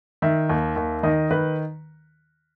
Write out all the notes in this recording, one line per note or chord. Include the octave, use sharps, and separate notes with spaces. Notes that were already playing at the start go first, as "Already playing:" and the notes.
D#3 E5
D#2
D#2
D#3 D#5
D#3 B4